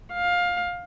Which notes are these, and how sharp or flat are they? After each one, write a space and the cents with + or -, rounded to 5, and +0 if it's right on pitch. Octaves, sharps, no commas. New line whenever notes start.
F5 +20